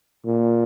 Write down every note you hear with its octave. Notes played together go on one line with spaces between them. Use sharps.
A#2